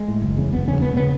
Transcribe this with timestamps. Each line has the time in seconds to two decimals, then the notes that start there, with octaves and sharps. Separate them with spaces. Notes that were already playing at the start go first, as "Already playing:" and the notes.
Already playing: G#3
0.08 A2
0.22 F#1
0.37 E2 C#3
0.53 F#1 B3
0.67 E2 C#3 C#4
0.81 E1 B3
0.97 C#3 B3